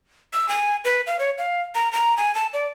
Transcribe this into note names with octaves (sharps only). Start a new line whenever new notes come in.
E6
G#5
B4
F5
C#5
F5
A#5
A#5
G#5
A5
D5